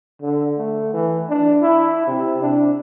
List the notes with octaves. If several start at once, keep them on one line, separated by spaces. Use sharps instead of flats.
D3
A3
E3
D4
E4
C3
D4